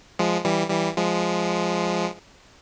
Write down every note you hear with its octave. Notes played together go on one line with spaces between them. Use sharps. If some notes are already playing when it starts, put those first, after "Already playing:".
F3 G#3
E3 G3
E3 G3
F3 G#3